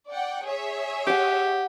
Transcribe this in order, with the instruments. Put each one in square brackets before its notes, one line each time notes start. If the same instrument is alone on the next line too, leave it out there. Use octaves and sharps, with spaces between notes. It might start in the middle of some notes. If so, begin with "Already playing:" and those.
[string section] D5 F#5 G5
G#4 C#5 E5
[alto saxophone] G4 [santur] F#5 D#6